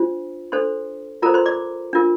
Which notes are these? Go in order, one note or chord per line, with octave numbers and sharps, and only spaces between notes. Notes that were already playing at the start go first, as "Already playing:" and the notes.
Already playing: D4 F4 C5
D4 A4 C5 C6
F4 A4 A#4 C5 A#5
C5 C6
D5 D6
D4 F4 A#4